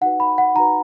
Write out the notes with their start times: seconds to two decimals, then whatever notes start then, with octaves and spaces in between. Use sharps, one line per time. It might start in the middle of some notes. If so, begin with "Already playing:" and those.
0.01 D#4 F#4 B4 F#5
0.20 B5
0.38 F#5
0.55 D#4 F#4 B4 A#5